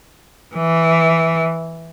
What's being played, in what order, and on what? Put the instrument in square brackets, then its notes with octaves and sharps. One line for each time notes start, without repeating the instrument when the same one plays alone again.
[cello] E3